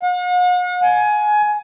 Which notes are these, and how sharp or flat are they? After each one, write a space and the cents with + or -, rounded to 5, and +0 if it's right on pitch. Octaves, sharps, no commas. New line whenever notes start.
F#5 -45
G#5 +20